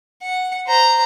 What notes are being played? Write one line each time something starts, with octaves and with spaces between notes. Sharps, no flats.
F#5
C5 A#5